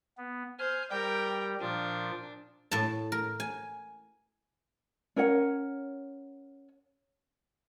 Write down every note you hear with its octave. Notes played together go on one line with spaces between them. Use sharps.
B3
C5 G#5 F6
G3 G4 A#4 G5
A#2 F3 D4
A2 A5
A#4
G#5
C#4 A#4 C#5 F#5